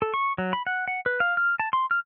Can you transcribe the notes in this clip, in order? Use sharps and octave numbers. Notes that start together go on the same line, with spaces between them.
A4
C#6
F#3
B5
F#5
F#5
B4
F5
F6
A5
C6
F6